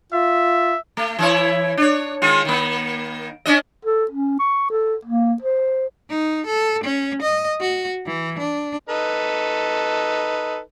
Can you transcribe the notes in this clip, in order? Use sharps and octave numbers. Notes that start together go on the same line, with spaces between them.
F4 E5
A3
E3 E4 C#5
D4 C#5
D#3 G#3 F4
D#3 A#3
C#4 D4 D#5
A4
C#4
C#6
A4
A#3
C5
D#4
A4
C#4
D#5
F#4
E3
D4
D#4 A4 B4